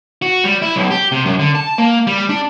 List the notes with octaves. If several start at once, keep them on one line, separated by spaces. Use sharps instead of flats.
F#4
G3
E4
B1
G4
C3
F#2
D3
A5
A#3
G3
D4